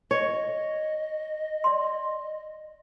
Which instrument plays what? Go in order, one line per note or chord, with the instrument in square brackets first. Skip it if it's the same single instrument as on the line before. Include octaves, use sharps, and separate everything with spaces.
[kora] C#5 [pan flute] D#5
[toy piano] D5 C6